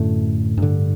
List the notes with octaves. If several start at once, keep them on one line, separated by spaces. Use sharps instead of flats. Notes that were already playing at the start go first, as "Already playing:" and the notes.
Already playing: F#2 A2 D3 A3
G2 D3